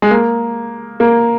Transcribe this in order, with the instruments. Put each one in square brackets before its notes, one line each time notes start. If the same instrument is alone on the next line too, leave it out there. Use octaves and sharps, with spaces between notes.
[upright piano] G#3
A#3
A#3